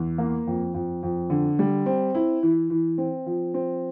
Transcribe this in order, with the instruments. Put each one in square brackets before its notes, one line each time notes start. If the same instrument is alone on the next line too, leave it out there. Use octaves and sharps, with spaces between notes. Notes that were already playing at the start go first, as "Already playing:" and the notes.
Already playing: [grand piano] E2
A#3
F2
F2
F2
D3
G3
C4
E4
E3
E3
C4
F3
C4